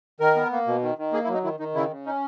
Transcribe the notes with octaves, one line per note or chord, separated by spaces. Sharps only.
D#3 A#4
B3
A#3
B2
D#3
D#3
A#3 G#4
E4
F#3
D#4
D#3 E4
D#3 D#4
C#3 E4
C#3
C#4 D#4